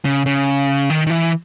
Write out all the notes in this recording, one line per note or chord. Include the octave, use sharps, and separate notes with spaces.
C#3
C#3
D#3
D#3
E3